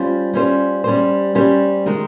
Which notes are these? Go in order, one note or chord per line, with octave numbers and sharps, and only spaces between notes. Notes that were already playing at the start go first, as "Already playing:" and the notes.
Already playing: G3 C#4 F4 C5
G3 C#4 F4 C5
G3 C#4 G4 C5
G3 C#4 G4 C5
D#3 G#3